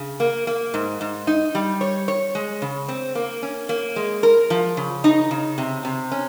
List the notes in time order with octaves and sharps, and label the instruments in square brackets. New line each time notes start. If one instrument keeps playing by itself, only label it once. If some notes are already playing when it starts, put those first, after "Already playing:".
Already playing: [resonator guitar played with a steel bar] C#3
A#3
A#3
G#2
G#2
D#4
G3
C#5
C#5
G#3
C#3
C4
A#3
C#4
A#3
G#3
A#4
F3
C#3
D#4
C#3
C3
C3
C#4